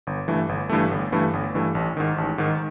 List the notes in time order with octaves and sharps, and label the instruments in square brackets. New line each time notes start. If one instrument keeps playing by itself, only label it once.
[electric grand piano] G1
G2 E3 A3
G1
G2 E3 A3
G1
G2 E3 A3
G1
G2 E3 A3
A1
G#2 D#3
A1
G#2 D#3